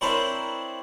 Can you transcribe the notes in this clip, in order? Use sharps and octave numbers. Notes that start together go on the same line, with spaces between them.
C4 D4 E4 A#4 C5 C#5